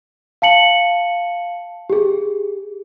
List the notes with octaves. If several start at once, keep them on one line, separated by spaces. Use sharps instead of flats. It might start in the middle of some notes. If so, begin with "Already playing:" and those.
F5 A5 C#7 F#7
G4 G#4